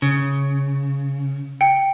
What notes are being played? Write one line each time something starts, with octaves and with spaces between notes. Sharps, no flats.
C#3
G5 C#7